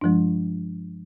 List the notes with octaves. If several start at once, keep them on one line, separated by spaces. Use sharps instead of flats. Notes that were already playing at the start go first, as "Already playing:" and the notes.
G2 F3 G#3 D4